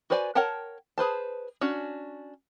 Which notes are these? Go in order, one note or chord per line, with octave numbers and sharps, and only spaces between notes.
F#4 B4 C5 D5 G#5
A#4 C#5 F#5 G5 A5
G#4 B4 C5 A5
C#4 D4 F#4